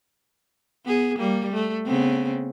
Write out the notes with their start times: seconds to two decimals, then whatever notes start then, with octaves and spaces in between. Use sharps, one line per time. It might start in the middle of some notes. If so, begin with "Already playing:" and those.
0.85 B3 G#4
1.18 G3 A#3
1.53 A3
1.85 C#3 B3 C4